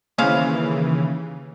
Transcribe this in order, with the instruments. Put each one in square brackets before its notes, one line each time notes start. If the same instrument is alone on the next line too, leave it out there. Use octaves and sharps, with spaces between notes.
[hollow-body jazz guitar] D#2 A#3 B5 [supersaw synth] C#3 E3 [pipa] C#4 C5 F5